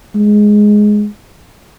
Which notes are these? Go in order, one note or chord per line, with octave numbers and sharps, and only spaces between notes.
G#3